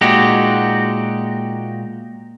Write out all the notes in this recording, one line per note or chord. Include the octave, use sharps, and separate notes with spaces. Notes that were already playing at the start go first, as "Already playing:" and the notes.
A#2 G#3 D#4 F#4 G4